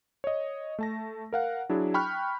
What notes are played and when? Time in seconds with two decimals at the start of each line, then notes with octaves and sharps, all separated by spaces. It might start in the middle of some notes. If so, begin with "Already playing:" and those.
0.24 C#5 D#5
0.79 A3 A5 A#6
1.33 A#4 F5 F#5
1.69 F#3 D4 E4 G#4
1.94 G5 B5 C#6 F6 F#6